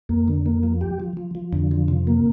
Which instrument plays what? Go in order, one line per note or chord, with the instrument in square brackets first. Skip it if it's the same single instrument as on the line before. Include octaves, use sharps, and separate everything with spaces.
[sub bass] F2 [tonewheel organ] A#3
[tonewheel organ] D3
A#3
F3
G4
F3
F3
F3
[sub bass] F2 [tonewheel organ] D3
[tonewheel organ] F3
C3
A#3